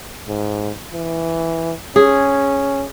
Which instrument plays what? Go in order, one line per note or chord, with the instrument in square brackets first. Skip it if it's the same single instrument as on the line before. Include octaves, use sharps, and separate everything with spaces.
[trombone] G#2
E3
[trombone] C#4 [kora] G#4